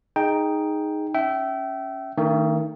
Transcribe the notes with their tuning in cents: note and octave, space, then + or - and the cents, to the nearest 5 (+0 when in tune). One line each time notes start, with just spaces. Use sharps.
D#4 +0 G#4 +0 G5 +5
C#4 +0 E5 +0 G5 -30
D#3 +15 A3 +45 D4 -10